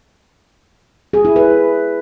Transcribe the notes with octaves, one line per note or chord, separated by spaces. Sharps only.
G#4
E4
B4